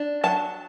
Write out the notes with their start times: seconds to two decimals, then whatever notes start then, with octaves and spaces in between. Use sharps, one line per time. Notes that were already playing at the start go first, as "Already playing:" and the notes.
Already playing: D4
0.24 F#3 A5